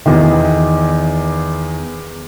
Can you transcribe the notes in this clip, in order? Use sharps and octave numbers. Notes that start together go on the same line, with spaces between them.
E2 D#3